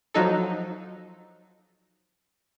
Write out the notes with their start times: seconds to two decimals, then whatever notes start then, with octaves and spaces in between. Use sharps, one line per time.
0.14 F3 F#3 D#4 A4